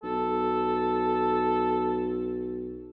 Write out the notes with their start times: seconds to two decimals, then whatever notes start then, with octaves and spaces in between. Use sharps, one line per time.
0.03 B1 A4